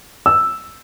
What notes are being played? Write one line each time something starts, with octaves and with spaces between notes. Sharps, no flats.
E6